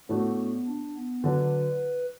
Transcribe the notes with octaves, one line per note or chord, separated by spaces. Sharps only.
A2 A3 B3 D4 F#4
D4
B3
D3 F#3 D4 B4